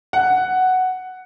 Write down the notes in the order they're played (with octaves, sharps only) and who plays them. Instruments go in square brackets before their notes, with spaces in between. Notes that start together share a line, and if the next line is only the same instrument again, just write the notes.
[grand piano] F#5